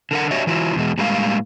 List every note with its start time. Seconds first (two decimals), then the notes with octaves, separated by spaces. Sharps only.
0.11 D3 A#4 F#5
0.31 D4 F#4 G4 C#5 D#5 E5
0.47 E3 F#3 E4 F4
0.76 E2 B2 G#3
0.98 A2 G3 G#3 A#3 F5